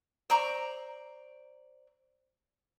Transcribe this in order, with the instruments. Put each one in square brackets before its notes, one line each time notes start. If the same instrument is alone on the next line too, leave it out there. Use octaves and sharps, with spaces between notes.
[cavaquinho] C5 D5 A#5 C#6